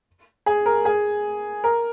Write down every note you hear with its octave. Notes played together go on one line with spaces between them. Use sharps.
G#4
A#4
G#4
A#4